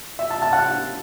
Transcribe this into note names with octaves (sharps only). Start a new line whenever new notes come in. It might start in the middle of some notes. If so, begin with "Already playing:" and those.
E5
A5
A5
F#5